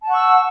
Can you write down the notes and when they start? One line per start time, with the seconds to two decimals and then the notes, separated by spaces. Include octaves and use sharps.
0.03 A5
0.06 F#5
0.10 C#6
0.13 E6